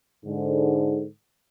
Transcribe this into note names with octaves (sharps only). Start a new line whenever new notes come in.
G#2 D3